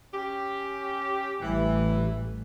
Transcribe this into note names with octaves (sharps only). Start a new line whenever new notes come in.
C#4 G4
A1 E3 G3 A3